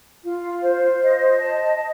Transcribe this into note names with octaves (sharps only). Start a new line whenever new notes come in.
F4
C5
D#5
A5
D#5